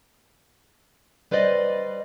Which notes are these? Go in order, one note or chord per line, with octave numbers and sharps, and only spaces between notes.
G3 B4 C5 D5 D#5